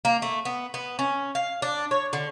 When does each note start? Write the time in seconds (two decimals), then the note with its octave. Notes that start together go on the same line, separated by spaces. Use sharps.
0.05 A#3
0.22 A3
0.45 B3
0.74 B3
0.99 C#4
1.35 F5
1.62 D4
1.91 C#5
2.13 D3